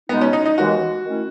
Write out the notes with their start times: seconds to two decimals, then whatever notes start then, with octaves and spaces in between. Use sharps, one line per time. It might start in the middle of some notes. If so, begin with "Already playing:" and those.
0.09 B2 G#3 B3 D#4
0.21 C#4
0.33 D#4
0.46 D#4
0.57 D#2 C#3 E3 G#3 B3 F#4
1.05 D#3 A3 C#4 E4